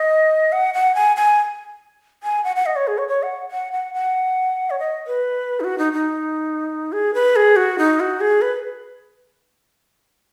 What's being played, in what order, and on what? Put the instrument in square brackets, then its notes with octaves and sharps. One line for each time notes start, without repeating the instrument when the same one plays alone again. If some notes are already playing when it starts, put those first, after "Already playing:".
Already playing: [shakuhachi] D#5
F#5
F#5
G#5
G#5
G#5
F#5
F#5
D#5
C#5
G#4
C#5
C#5
F#5
F#5
F#5
F#5
C#5
D#5
B4
D#4
F#4
D#4
D#4
G#4
B4
G#4
F#4
D#4
F#4
G#4
B4